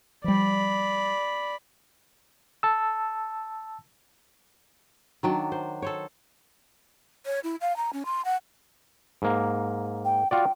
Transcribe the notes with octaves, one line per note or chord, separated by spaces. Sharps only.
F3 G3 D5 B5
A5 E6
D#3 F#3 D4
C5
A4 C5 C#5
C#5
E4
F5
A#5
C#4
C6
F#5
G#2 A#3
G5
F4 F#4 D5 G5